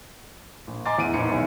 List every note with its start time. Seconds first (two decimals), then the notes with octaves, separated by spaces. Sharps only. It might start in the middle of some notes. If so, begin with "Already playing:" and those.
0.67 A#1
0.86 D#5 G#5 A#5 C6 D6 A6
0.98 E2 D7 D#7
1.14 A#1 D#4 C#7
1.31 B1 E2